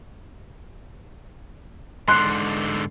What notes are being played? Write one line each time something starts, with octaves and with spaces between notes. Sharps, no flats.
G#2 D3 C6 F#6